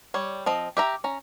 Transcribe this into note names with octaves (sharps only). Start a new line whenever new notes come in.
G3 C#5
F3 C4 D#5
G4 E5 A#5
C#4 A#5